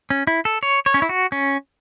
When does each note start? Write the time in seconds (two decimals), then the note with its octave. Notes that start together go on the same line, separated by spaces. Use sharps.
0.10 C#4
0.27 E4
0.45 A4
0.63 C#5
0.86 C#5
0.94 C#4
1.02 E4
1.09 F#4
1.32 C#4